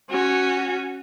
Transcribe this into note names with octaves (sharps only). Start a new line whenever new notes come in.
C#4 F#4